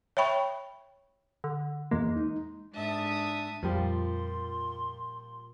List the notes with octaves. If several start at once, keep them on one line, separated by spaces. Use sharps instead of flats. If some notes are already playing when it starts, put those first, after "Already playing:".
C#5 E5 G5 B5 C#6
D3
E2 G#3 A#3
D#4
G#2 D4 E5 A5 D#6
F2 A#2 F3 G3 C6